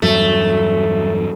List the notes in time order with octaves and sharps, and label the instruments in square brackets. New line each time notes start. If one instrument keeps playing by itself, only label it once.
[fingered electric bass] E2 G2 F#3 [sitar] A3